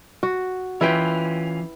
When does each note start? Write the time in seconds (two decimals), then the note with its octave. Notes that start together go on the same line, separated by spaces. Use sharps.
0.23 F#4
0.81 E3 C#4 E4 F4 B4 G5